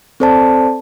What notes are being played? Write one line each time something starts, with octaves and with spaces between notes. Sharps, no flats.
C4 A4 C5 D5 A5